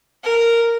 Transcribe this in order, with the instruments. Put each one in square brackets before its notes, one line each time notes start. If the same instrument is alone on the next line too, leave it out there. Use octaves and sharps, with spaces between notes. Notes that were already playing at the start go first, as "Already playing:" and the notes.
[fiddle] A#4